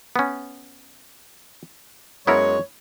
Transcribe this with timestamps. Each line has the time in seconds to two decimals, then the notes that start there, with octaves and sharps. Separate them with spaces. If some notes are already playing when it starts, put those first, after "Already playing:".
0.16 B3 C#4
2.27 F#2 G#3 B3 E4 A#4 C#5